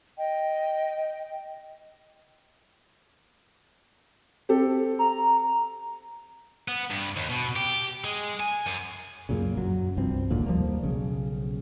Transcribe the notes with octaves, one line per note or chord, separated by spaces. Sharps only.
D#5 G5
C4 G4 A4
A#5
B3
G2
D#2
B2
G4
G#3
G#5
F#2
F#2 A#2 C#3
F#2 F#3
C2 G2 F3 C4
G#1 D#2 A#2 D3
D#2 F3 G3 A#3
B1 C#3